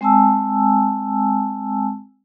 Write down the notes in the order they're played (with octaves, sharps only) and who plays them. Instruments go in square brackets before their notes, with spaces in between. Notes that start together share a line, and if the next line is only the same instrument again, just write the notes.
[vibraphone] G#3 C4 G#5 A5 E6